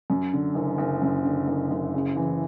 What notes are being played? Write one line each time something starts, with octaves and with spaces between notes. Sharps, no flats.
F#2
D3
F#1
F#1
F#2
D3
F#1
F#1
C#3
E3